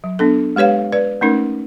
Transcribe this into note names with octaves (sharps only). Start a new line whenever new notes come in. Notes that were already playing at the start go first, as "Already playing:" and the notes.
F#3
B3 D4 A4
G#3 G4 B4 C#5 F5
B4 D5
A3 C#4 D#4 A#4